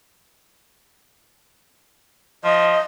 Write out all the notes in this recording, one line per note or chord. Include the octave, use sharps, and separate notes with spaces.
F3 D#5